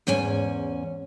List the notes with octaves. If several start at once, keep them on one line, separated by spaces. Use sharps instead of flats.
E2 G#2 C#4 G#5